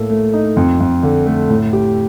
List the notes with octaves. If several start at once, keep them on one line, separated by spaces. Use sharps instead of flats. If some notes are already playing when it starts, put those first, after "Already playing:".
Already playing: A2 A#3 A4
A3
D#4
F2
F2
D3
A3
A2
G4